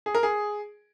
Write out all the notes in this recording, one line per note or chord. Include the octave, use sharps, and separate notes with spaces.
G#4
A#4
G#4